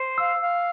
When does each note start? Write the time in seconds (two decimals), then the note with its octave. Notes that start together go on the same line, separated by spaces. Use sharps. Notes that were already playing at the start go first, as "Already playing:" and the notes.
Already playing: C5
0.17 F5 E6
0.42 F5